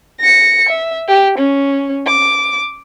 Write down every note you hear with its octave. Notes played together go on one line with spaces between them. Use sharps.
A#6 C#7
E5
G4
C#4
D6